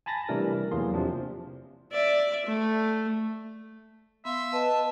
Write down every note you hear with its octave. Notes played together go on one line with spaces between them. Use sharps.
G#5 A5 B5 A6 A#6
C3 E3 G3 A3 D4 A#4
E2 E3 F#3 A#3 G#4 C6
C3 F3 C4 D4
D5 E5
A3
B3 E5 F5 C6
B4 D#5 A5